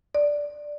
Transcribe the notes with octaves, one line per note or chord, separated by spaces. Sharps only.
D5